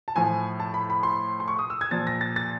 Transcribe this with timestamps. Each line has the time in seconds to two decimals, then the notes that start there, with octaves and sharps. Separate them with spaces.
0.08 A5
0.16 A2 F3 G#5
0.60 A5
0.74 B5
0.90 B5
1.03 C6
1.40 C6
1.48 C#6
1.59 D#6
1.70 E6
1.81 G#6
1.91 A#2 F3 A6
2.07 A#6
2.21 A6
2.36 A6